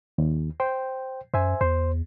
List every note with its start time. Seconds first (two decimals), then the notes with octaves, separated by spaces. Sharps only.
0.18 D#2
0.60 C5 G5
1.34 F#2 C5 E5 G#5
1.61 E2 C5